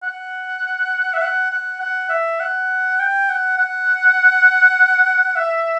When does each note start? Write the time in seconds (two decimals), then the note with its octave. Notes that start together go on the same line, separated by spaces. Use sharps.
0.03 F#5
1.14 E5
1.22 F#5
1.51 F#5
1.80 F#5
2.10 E5
2.40 F#5
2.99 G5
3.29 F#5
3.58 F#5
5.36 E5